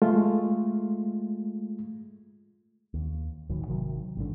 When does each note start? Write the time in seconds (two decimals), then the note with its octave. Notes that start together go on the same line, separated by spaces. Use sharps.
0.02 G#3 A3 F4
2.94 D#2
3.49 D#1 A2 D#3 F#3
3.68 G#1 C3 D#3 F#3
4.17 A1 G#2 D3